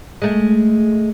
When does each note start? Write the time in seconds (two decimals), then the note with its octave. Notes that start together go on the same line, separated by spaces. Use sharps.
0.22 G#3 A3